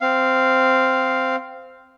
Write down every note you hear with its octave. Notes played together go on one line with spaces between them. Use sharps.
C4 F5